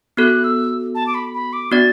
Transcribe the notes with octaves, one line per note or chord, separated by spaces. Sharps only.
B3 F#4 A4 F#6
E6
A5
D6
B5
B5
D6
B3 D4 F#4 D5 A6